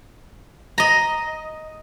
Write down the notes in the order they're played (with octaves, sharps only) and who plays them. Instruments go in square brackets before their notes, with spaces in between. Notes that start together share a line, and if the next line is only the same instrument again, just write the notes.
[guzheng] D#5 A#5